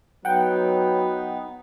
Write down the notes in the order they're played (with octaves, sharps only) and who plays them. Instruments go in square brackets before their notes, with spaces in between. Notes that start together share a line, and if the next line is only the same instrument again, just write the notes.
[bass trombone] F#3 [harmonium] B3 D#4 B4 [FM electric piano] F#5 G5